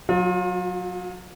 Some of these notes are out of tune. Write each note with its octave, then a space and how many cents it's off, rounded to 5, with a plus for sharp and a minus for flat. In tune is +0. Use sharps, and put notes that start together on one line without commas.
F#3 -15 F4 +35